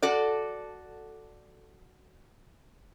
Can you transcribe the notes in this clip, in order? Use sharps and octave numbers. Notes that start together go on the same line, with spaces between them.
F#4 A4 D5